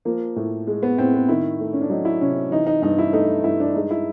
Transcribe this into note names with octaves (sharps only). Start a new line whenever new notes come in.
F3 A#3
A2
G#3
B3
A2 C4
B3
D#3 E4
A3
C#4
D4
F#3 D#4
E4
C3 C#4
E3 D#4
D#4
G2 D#4
E4
A3 D#4
G2 E4
D4
G#3 D#4
E4